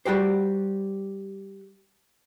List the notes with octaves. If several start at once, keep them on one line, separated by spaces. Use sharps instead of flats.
G3 F#4 G4 C5